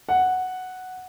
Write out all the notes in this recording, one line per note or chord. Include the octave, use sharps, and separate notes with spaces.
F#5